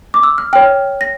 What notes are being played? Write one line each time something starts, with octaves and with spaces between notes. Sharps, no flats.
D6
E6
F6
C#5 G5 F6
A#6